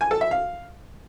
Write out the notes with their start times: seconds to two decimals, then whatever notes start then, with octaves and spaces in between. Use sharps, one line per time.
0.01 G#5
0.11 A4
0.21 E5
0.31 F5